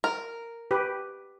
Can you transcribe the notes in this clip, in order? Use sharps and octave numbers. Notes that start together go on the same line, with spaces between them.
A#4
G4 B4